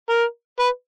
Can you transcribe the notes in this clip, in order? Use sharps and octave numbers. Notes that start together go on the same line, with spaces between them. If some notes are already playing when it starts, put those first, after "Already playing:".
A#4
B4